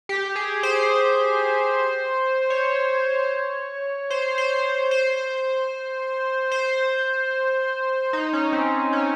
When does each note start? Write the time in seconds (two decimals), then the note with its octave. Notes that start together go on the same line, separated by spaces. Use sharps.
0.09 G4
0.36 G#4
0.63 C5
2.50 C#5
4.10 C5
4.38 C5
4.91 C5
6.52 C5
8.13 D#4
8.33 C#4
8.53 C4
8.93 C#4